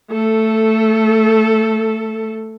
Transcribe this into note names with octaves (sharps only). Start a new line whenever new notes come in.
A3 A4